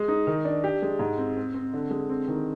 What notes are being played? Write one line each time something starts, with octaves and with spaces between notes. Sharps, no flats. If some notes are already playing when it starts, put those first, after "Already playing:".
Already playing: G#3
D#4
D#3
D4
G4
G#3
G#2
C4
C4
C4
D3
G#3
C4
D#3